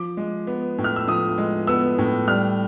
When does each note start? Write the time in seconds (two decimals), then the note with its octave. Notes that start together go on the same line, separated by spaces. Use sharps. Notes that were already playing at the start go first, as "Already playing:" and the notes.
Already playing: F3 D6
0.17 G#3
0.47 B3
0.78 A2
0.84 F6
0.96 E6
1.08 F3 D#6
1.38 G#3
1.67 B3 E6
1.98 A2
2.28 G3 F6